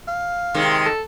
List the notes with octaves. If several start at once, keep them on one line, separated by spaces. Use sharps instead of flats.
F5
C3 D#3 G#3
A4